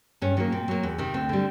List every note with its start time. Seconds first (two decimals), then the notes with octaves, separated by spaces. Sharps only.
0.22 G2 C#4
0.37 D#3 F#3 A#3 C#4
0.52 A#2 C4
0.68 F#3 A#3
0.83 E2
0.98 C3 D#3
1.14 D2 C4
1.29 D3 G3